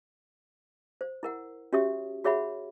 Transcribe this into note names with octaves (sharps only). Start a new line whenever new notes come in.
C5
E4 A#4 F#5
C#4 F#4 G4 C#5 E5 D#6
F#4 G#4 C#5 E5 F#5 B5